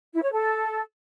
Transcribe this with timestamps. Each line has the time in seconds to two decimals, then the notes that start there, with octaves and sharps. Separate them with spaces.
0.14 E4
0.23 C#5
0.32 A4